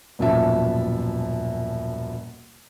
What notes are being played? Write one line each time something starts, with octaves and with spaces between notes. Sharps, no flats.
D#1 F#2 B2 F3 E5 A5